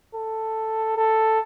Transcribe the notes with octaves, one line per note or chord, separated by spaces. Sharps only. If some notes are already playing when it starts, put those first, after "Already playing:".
A4
A4